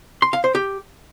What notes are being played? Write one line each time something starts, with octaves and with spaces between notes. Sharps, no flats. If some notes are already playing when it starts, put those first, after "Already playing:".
C6
F5
C5
G4